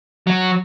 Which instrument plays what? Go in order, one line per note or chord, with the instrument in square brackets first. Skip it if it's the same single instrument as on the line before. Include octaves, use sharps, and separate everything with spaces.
[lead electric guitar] F#3